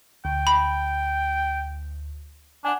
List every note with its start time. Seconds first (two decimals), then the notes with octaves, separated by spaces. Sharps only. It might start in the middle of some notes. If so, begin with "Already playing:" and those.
0.25 D2 G5
0.47 B5
2.65 D4 F#5 G#5